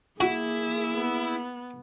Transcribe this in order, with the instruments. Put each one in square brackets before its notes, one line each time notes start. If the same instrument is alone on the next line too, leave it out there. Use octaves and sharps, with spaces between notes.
[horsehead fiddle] A#3 G#4 [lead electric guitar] E4 [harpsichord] F#4
[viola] B3